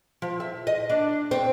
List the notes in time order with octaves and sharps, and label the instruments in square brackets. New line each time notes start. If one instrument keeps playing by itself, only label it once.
[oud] F3
E5
D#5
D4
C4